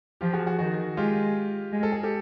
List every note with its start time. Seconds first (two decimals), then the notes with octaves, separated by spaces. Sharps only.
0.21 F3 F4 G4
0.34 F#4 G#4
0.46 F#4 G#4
0.59 D#3 F#4 G#4
0.97 G#3 F4 G4
1.72 G#3
1.83 A4
1.92 G#4
2.03 G4 A4